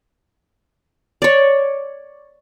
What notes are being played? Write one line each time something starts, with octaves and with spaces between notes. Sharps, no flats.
C#5 D5